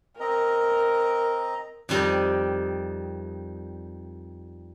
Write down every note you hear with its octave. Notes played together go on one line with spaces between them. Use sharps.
C4 A#4 D#5 A#5
F2 D#3 G3 G4 D#5